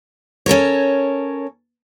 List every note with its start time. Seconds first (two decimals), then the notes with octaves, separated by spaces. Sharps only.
0.46 C#4 A4 A#4 C#5